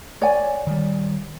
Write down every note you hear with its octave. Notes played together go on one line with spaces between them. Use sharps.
C#5 D5 G#5
D#3 G3